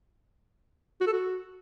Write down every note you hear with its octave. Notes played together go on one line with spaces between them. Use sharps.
F#4
A4
F#4